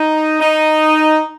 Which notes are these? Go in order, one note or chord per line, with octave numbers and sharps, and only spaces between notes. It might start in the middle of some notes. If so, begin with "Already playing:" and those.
Already playing: D#4
D#4